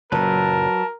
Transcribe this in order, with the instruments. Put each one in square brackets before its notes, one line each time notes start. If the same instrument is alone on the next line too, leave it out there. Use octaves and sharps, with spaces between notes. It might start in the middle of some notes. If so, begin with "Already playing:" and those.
[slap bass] F#1 A#2 [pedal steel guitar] F#3 B4 [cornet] A#4 [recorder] A5